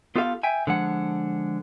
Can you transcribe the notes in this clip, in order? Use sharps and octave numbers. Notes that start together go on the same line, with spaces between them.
B3 F4 G4 A4 E5 F5
E5 G5 G#5
D3 F3 G#3 F#5